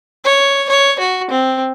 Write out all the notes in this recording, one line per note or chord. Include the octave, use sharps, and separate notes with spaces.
C#5
C#5
F#4
C4